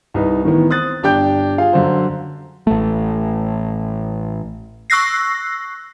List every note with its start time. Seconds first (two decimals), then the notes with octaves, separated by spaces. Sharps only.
0.14 C2 D#4 B4
0.44 A2 D#3 E3 B3
0.70 C4 D#6 F#6 A6
1.03 G1 D4 G4 G5 G6
1.58 F4 G#4 F5
1.73 F#2 D3 C5
2.67 A1 A3
4.90 C#6 E6 F#6 A#6 C7